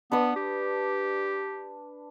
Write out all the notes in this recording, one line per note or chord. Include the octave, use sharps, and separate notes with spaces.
B3 D4 B4 D#6
G4